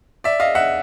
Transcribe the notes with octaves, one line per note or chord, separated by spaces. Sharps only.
D5 E5
D#5 F5
E5 F#5